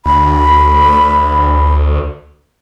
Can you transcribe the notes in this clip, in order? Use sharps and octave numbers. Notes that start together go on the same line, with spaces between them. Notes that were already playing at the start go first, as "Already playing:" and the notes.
D2 B5